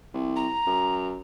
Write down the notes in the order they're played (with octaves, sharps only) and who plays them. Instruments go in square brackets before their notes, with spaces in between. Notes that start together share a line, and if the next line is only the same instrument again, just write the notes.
[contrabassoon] C2
[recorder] A#5
[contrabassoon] F#2